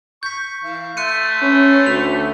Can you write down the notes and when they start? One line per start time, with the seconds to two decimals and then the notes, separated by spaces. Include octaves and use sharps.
0.23 C#6 G6 B6
0.64 E3 F5
0.97 A3 E5 C6 F#6 C#7 D#7
1.42 C#4 B4 C6 C#6
1.86 D2 F7